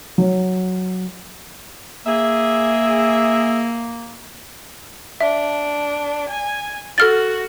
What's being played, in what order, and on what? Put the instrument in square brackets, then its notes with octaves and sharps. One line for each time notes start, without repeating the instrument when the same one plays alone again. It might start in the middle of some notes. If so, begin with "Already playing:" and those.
[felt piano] F#3 C#5
[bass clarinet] A#3 [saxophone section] G#4 E5
[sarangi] D4 [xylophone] E5
[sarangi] G#5
[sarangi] F#4 [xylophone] A4 F6 A6